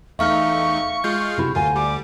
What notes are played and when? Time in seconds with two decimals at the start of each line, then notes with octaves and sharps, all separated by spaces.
0.19 E2 A3 D#4 E5 F5 C#6 F6
1.04 G#3 F4 F5 G6
1.37 C3 E4 F#4
1.55 D2 F4 G#5
1.76 G3 D6